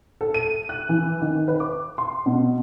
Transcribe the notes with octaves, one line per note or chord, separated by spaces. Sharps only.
A4
D#7
F#6
E3
D#3
B4
D6
C6
B2